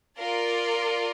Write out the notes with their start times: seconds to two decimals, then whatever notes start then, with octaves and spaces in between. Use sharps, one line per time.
0.18 F4 A#4 D5